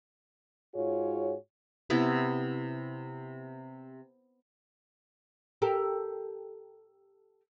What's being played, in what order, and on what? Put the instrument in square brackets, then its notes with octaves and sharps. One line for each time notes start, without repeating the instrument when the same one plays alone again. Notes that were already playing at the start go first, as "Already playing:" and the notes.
[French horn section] G#2 F4 F#4 G#4 C#5
[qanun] C3 B3 E4
[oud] G4 A4 A#4